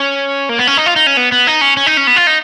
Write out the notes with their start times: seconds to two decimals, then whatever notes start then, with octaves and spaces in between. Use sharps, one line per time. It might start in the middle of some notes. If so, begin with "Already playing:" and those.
Already playing: C#4
0.49 A#3
0.59 B3
0.67 C#4
0.77 D#4
0.86 F4
0.96 D#4
1.07 C#4
1.17 B3
1.32 B3
1.47 D#4
1.61 C#4
1.77 C#4
1.86 D#4
1.97 C#4
2.07 B3
2.16 F4
2.27 D#4